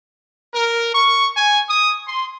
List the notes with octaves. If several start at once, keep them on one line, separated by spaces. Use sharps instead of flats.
A#4
C#6
G#5
D#6
C6